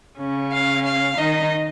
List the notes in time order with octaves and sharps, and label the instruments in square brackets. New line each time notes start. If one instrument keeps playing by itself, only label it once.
[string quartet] C#3 C#4
[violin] F5
F5
[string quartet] D#3 D#4 [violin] D#5